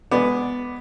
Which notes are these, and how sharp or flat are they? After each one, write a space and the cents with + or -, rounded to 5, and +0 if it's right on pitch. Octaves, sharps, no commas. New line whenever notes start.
G#3 -10 B3 +0 D5 +0